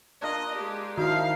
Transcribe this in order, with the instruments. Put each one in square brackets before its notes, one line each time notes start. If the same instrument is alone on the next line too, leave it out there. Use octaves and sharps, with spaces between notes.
[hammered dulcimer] D4 F4 A#4 [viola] D#5
[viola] G#3 G4
[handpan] D#3 E4 [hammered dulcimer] F3 D#4 [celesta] F#4 [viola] F5